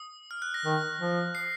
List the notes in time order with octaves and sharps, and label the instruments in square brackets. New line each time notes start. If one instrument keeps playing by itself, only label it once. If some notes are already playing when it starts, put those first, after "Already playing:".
Already playing: [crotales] D#6
F6
F#6
A#6
[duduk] D#3
F3
[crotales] C7